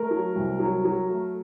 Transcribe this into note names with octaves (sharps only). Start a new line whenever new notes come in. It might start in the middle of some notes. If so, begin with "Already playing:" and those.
Already playing: A3 A#4
F#3
C2
F#3
F#3
A3